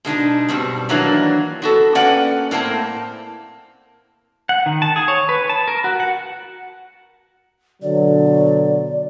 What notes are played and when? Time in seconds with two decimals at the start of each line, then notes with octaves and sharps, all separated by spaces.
0.05 B2 G#3 D4 D#4
0.49 G2 B2 G3 C4
0.89 D#3 E3 F#3 A#3 D4
1.62 B3 F#4 A4
1.95 A#3 C#4 B4 D5 F#5 G5
2.51 A2 A#3 C4 A5
4.49 F#5
4.66 D#3
4.82 A5
4.96 G#4
5.08 C#5
5.29 B4
5.49 A5
5.68 A#4
5.84 F#4
6.00 F#5
7.82 B2 D3 F#3 D5